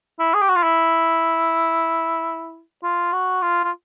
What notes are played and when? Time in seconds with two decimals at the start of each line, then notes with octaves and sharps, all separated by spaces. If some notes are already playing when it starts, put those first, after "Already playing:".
0.19 E4
0.34 G#4
0.42 G4
0.49 F#4
0.56 F4
0.63 E4
2.83 F4
3.12 F#4
3.42 F4
3.64 F4